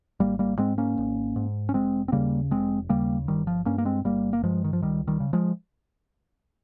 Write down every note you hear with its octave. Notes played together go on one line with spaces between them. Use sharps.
G#1 G3 A#3
G3 A#3
G#2 G#3 C4
A#3 C#4
G#1
G#2
C#4
F1 G#3 C4
C4
D#2 C#3 G3 A#3
F1 G#3 C4
D#2 C#3 G3 A#3
G1 D#3 G3
F3
G2 A#3 C#4
A#3
G#3 C4
G1 G3 A#3
A#3
G2 F3 G#3
D#3
F3
C#2 D#3 G3
D#3 G3
C#3
F3 G#3